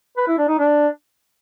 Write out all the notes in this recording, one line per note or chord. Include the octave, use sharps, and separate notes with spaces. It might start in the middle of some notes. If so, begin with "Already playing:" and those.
B4
E4
D4
D#4
D4